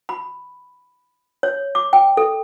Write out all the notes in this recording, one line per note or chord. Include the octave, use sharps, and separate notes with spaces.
B5
C#5
D6
G5
A4